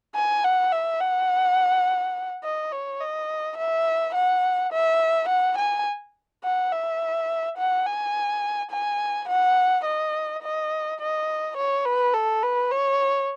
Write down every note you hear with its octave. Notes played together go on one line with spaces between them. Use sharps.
G#5
F#5
E5
F#5
D#5
C#5
D#5
E5
F#5
E5
F#5
G#5
F#5
E5
F#5
G#5
G#5
F#5
D#5
D#5
D#5
C#5
B4
A4
B4
C#5